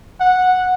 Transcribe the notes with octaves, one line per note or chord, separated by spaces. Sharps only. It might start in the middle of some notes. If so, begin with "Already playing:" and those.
F#5